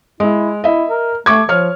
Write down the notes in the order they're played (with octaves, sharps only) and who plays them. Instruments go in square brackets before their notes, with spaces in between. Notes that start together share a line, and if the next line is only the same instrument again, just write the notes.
[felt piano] G#3 [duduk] E4
[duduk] E4 [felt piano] D#5 E5
[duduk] A#4
[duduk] A3 [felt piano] C#6 D6 G#6
[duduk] F3 [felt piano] C#5 F6